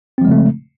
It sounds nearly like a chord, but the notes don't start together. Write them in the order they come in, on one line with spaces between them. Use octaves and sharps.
C4 F3 G#3 C#3 A3